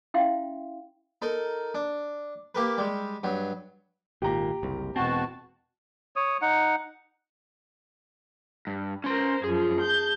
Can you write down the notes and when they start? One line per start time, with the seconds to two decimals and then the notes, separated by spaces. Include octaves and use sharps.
0.14 C#4 E4 E5 F5 G5 C6
1.22 D#4 A4 A#4
1.74 D4
2.55 A#3 G4 A#4 B4
2.78 G3 G#3
3.23 G2 F#3
4.22 G#1 A#2 G4 A#5
4.63 F#1 C2
4.96 E1 B2 C4 F#4 A5
6.16 C#5 D#6
6.42 D#4 F#5
8.67 G2
9.04 C#4 A#4 C5 C6
9.44 F#2 F3 G#4
9.80 A5 G6